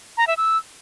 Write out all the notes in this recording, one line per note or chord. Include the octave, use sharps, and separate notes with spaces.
A#5
E5
E6